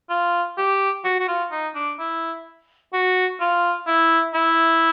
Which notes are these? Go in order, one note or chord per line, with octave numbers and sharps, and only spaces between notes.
F4
G4
F#4
F#4
F4
D#4
D4
E4
F#4
F4
E4
E4